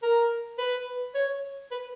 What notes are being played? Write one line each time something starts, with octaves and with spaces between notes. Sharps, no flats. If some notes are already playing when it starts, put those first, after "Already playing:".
A#4
B4
C#5
B4